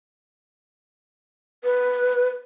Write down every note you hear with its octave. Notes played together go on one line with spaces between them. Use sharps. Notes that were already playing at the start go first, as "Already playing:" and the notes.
B4